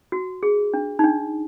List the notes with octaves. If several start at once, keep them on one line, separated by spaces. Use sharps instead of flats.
F#4
G#4
D4
D#4
D4